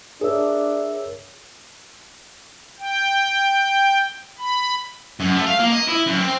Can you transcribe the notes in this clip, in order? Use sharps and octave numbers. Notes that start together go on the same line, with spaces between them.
D4 G#4 A#4 C#5 E5 E6
G5
B5
F#2
A3
F5
A#3
D#5
E4
F#2
C4